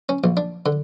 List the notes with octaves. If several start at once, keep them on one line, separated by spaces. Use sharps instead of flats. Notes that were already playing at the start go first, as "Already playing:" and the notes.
C#4
A#1
D4
D3